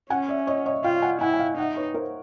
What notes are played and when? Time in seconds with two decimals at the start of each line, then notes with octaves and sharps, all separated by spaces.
0.10 C#4 F#5 G#5
0.29 D5 E5
0.47 C#5 D#5
0.66 C#5 D#5
0.84 F4 F5 G5
1.02 F#5 G#5
1.21 E4 F#5 G#5
1.33 G#5
1.39 F5 G5
1.57 D#4 E5 F#5
1.76 B4 C#5
1.94 A#4 C5